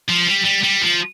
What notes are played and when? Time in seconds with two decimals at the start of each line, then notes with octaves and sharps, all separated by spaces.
0.09 F3
0.27 G3
0.45 G3
0.64 G3
0.82 F3